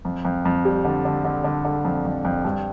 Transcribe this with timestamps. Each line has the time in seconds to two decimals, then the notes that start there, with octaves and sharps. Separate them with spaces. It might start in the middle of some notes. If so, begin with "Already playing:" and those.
0.05 F2
0.25 F2
0.45 F2
0.65 G3
0.84 D3
1.05 D3
1.24 D3
1.44 D3
1.65 D3
1.85 F2
2.05 F2
2.25 F2
2.45 G2